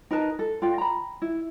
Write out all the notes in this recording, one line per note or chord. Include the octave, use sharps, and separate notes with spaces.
D#4 A#4 B4 A5
A4
F4 D5 G5
A#5 B5
E4